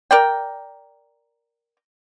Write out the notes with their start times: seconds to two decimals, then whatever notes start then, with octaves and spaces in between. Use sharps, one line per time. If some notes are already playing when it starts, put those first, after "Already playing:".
0.11 A#4 D5 G5